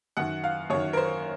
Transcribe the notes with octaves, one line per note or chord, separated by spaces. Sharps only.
F#2 D#3 F#5
F5
F#2 D#3 C#5
A#4
C5